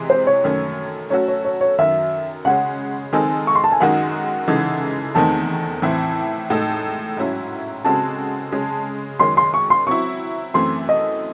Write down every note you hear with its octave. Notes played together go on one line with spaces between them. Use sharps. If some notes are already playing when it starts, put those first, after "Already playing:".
Already playing: C3 E3 G#3
C5
C#5
F#2 D#3 A3 C#4
F#3 A3 C#4 F#4 A4 C#5
C#5
C#5
C#5
F#2 D#3 F#3 E5
C#3 G#3 C#4 F#5
D#3 G#3 C4 D#4 A4 G#5
C#6
C6
A5
G#5
F#2 D#3 G#3 D#4 F#4 F#5
C#3 E3 G#3 D#4 A4
E2 D#3 A3 C4 D#4 A5
A2 E3 C4 E4
A2 G#3 D#4 A4
G#2 F#3 C#4 E4
C#3 G#3 C4 F#4 A4 A5
C#3 G#3 C#4
F#2 D#3 G#3 C#4 C6
C6
C#6
C6
F#3 C4 E4 C#6
F#2 E3 A3 C4 C6
D#5